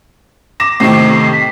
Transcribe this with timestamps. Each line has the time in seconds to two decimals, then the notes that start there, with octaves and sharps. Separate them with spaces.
0.60 D6 A#6 E7
0.80 A2 C3 D#3 C7
1.33 B6